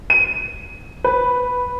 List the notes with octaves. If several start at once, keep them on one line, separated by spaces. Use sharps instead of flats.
D#7
B4